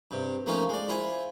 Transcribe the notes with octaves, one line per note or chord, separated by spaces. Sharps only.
G2 C3
F3 A3 A#3 C#4 D#4 F4
G#3 D5
E4 F4 C5 G#5